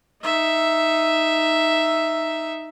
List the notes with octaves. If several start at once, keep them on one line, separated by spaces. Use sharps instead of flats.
D#4 E5